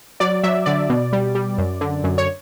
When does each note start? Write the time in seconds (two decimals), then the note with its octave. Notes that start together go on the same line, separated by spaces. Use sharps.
0.20 F#3 D5
0.43 F#3 E5
0.66 D3 D5
0.89 B2
1.12 G3
1.35 G3
1.58 F#2
1.81 D3
2.04 F#2
2.18 C#5